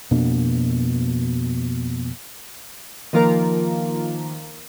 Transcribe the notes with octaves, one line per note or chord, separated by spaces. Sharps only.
F2 B2 A#3 D4
D#3 F3 A#3 F4 A#4